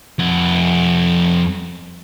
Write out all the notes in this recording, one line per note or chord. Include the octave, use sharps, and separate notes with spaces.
F2 F#5